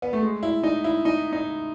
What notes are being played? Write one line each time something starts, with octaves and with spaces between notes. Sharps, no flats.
B3
A3
G#3
E4
D#4
E4
D#4
D#4